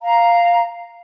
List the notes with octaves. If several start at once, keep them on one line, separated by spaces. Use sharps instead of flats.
F5 A#5